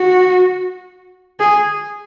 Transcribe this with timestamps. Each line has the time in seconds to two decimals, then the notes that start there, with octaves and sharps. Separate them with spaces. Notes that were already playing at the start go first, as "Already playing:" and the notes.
Already playing: F#4
1.40 G#4